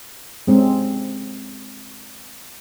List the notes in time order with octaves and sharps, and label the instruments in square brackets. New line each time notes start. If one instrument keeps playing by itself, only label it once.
[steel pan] G#3 C4 C#4